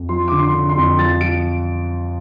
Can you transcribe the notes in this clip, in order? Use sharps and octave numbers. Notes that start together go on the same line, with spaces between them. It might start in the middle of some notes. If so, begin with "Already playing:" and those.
Already playing: F2
F3 C6
D3 D6
C6
D3
C6
F2
F3 A6
F3 D7